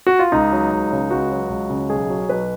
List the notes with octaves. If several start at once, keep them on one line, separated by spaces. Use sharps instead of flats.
F#4
F4
C#2 D#4
F#3
C#2
C#3
C#2 F#4
F#3
C#2
C#3
B1 G#4
F#3
B1 B4